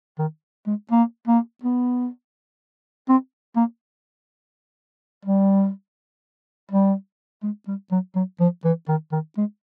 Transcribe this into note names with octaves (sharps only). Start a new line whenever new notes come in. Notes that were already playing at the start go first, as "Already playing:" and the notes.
D#3
G#3
A#3
A#3
B3
C4
A#3
G3
G3
G#3
G3
F#3
F#3
F3
E3
D#3
D#3
G#3